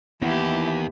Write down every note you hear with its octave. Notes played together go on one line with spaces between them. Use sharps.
D#2 E3 B3 E4 G4